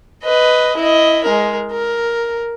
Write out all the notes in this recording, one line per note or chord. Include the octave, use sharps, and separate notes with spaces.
B4 D#5
E4 D#5
G#3 A#4
A#4